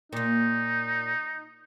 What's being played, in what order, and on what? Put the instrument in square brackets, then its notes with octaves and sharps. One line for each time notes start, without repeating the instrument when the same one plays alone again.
[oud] A#2 A#3 [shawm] D#4